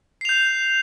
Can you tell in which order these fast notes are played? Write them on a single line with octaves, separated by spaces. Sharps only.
C7 F7 G6